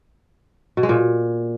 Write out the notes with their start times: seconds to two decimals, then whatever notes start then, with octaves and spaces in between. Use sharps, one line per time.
0.77 B2
0.83 G#3
0.89 A#2